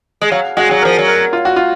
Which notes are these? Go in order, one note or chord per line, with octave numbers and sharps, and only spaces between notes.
G#3
F#3 F5
G#3 F#4
F#3 G#4
F3 A#4
F#3
A#4
F4
F#4
F4